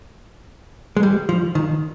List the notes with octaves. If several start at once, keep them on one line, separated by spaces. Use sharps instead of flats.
G#3
G3
F3
D#3